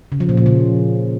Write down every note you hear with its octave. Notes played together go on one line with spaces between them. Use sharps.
C#3
F3
A#2
F3
C#3